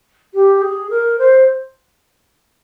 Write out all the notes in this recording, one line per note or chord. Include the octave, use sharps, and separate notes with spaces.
G4
G#4
A#4
C5